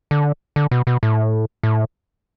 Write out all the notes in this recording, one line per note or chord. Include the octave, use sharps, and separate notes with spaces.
D3
D3
B2
B2
A2
A2